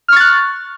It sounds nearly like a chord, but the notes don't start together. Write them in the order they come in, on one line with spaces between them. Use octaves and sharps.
F6 C#6 A6 F#6